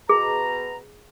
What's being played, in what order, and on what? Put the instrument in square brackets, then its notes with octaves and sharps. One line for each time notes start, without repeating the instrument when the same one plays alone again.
[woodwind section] B2 A#5 [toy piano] G#4